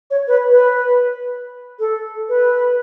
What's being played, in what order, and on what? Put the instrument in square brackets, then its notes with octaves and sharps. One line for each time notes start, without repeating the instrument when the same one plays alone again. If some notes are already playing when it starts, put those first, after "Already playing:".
[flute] C#5
B4
B4
A4
B4